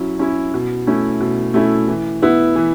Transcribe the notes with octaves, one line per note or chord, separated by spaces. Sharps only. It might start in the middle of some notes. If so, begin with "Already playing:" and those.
Already playing: F#3 C#4 E4
C#4 E4
B2
A3 C#4 E4
B2
A3 C#4 E4
E3
B3 E4
E3